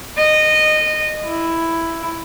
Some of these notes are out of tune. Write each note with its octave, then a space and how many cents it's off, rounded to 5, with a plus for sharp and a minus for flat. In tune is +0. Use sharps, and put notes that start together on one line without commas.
D#5 -15
E4 +5